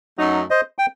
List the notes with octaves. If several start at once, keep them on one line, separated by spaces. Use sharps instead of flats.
F#2 F#3 A3 D#4
C5 D#5
G5